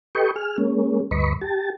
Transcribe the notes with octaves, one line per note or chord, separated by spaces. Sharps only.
G4 A4 B4 D#5 G5 C#6
G#4 F6
G#3 A#3 C#4
D2 G2 B4 D#5 B5 C#6
G4 A5